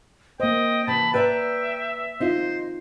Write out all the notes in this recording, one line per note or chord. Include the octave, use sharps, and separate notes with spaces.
A#3 C4 C5 D#5 G5
C3 E3 A5 B5
B4 D5 E5 G5 A#5
C4 D#4 F4 C5 D#5